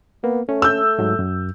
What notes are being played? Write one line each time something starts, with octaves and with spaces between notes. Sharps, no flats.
A#3 B3
A3 C#4
E6 G6
G#2 F#3
F#2